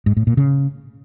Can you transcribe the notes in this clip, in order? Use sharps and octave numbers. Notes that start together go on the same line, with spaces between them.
G#2
A2
A#2
C#3